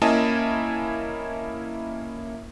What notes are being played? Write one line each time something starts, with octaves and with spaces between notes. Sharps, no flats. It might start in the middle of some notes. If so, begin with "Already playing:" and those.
A#3 C#4 E4 D#5 G#5 A5